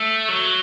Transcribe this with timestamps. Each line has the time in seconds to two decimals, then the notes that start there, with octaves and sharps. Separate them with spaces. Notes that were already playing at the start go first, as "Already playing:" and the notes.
Already playing: A3
0.29 F#3